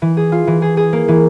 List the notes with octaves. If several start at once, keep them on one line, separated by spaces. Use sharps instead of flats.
E3
G#4
F4
E3
G#4
G#4
A#3
E3